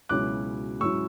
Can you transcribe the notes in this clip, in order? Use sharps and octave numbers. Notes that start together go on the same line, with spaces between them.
C#2 B2 F#3 C#4 E4 D6 F#6
G#2 F#3 C#4 E4 C#6 E6